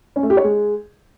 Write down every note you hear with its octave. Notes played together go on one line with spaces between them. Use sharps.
C#4
A3
G4
C#5
G#3